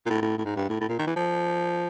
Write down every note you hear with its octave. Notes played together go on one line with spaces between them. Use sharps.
A#2
A2
A2
A2
G#2
G2
A2
A2
A#2
D#3
E3
F3